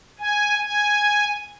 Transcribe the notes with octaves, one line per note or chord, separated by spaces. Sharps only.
G#5
G#5